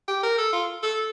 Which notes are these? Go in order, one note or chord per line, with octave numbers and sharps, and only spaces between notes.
G4
A#4
A4
F4
A4